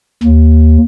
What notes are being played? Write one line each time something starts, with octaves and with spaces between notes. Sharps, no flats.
D#2